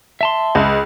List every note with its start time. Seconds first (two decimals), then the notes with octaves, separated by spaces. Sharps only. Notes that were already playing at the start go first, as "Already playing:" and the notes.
0.21 E5 A5 C6
0.55 C#2